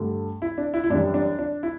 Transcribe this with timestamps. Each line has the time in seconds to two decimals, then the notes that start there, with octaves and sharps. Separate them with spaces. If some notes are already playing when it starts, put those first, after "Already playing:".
Already playing: G2 D3 A3
0.42 E4
0.58 D4
0.74 E4
0.84 E4
0.90 F#2 E3 G3 D4
1.14 D4
1.39 D4
1.63 E4